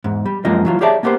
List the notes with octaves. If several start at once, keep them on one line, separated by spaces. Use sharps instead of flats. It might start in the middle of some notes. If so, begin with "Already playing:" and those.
E2 G#2
G3
F#2 F3 G#3 A#3 F4 D#5
E3 F#3 F4
G4 G#4 C#5 D5 E5 A5
A#3 B3 G4 A#4 C5